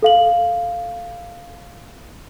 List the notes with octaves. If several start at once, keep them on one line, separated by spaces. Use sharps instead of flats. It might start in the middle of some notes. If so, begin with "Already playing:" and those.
A4 F5 F#7